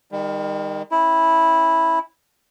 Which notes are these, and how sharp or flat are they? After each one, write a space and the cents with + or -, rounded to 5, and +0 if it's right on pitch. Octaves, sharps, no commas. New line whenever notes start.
D#3 +0 G3 +45
C#4 -35 E4 -10